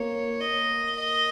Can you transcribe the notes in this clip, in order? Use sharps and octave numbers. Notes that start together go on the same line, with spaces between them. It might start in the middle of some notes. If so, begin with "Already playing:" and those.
Already playing: A#3 C#5
D#5
D#5